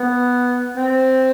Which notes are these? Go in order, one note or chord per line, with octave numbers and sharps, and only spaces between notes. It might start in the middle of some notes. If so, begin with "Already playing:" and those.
Already playing: B3
C4